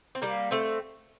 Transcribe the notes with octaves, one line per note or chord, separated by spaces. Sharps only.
C4
G3 A#3
A3 C4